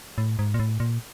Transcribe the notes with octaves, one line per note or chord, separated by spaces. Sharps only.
A2
G#2
A#2
A2
A#2